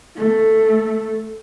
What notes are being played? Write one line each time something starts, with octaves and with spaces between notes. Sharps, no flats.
A3